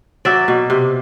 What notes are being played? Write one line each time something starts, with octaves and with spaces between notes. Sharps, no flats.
F#3 D5 E5
B2
C3